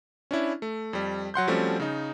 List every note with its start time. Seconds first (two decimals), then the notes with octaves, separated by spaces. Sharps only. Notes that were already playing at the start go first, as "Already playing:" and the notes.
0.31 C#4 D4 E4
0.62 A3
0.93 F2 G3
1.34 F#3 F#5 C6 G6
1.48 F3 G3 A3 C4 C#4 F#4
1.80 C#3 D#4